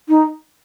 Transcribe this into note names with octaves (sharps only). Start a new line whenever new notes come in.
D#4